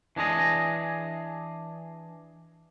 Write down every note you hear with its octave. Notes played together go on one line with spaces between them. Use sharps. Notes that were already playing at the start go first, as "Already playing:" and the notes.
E3 D4 G#4 D#5